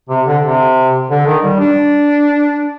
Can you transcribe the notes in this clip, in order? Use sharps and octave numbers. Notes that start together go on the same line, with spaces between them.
C3
D3
C3
D3
D#3
G3
D4